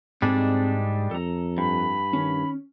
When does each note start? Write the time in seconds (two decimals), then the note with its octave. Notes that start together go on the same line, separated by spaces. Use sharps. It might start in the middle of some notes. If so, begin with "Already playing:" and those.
0.22 G#2 G3 G#3 C4 D4 G#4 A4
1.11 F2 A4 A#5
1.58 G2 B5
2.13 D#3 C#4